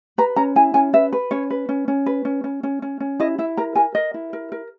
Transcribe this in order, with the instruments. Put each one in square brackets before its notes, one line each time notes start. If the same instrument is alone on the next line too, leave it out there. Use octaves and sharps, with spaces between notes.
[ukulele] B4 A#5
C#4 A#5
E4 G#5
C#4 G#5
B4 E5
B4
C#4 C#5
B4
C#4
C#4
B4
C#4
C#4
C#4
C#4
C#4
E4 D#5
E4 E5
A#4 A#5
A#4 G#5
A#4 D#5
E4
A#4
A#4